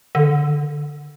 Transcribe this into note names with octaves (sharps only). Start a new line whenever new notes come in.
D3